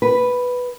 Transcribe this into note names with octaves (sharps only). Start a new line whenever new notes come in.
B4